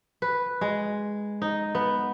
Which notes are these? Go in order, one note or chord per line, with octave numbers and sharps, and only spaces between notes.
B4
G#3
D#4
B3